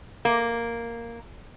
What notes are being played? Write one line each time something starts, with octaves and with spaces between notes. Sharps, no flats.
A#3